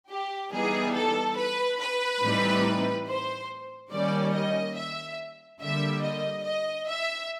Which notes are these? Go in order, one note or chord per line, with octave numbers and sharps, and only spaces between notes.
G4
E3 G3 B3 D#4 G#4
A4
B4
B4
A2 E3 G3 C4 D#4
C5
D#3 G3 A#3 C#4 D5
D#5
E5
D3 G3 A#3 E5
D#5
D#5
E5